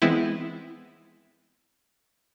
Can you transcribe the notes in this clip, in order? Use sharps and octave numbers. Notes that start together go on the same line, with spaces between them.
E3 G#3 B3 C4 E4